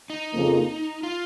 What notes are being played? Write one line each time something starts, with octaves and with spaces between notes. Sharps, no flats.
D#4
F2 C#3 F3 A#3
F4